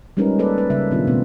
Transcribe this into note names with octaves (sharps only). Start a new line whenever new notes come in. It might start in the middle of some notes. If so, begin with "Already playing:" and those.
G3 G#3 C#4 D#4 A#4 B4
A#3 G#4 A4 B4 D5
B4
C#3 G3 E5
A#2 D#3 B3 D4 F4
B2 G3 A3 C4